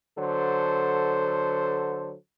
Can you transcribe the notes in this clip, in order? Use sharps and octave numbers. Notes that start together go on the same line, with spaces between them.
D3 F#3 A4 C5